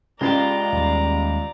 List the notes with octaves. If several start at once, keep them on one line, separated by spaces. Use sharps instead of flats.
C#2 G#3 F4 G4 D5 A#5
D#2 G3